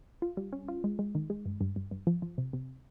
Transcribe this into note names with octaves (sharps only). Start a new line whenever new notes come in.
F4
G3
C#4
F4
G#3
G#3
D#3
G#3
G2
G2
G2
G2
F3
F3
C3
C3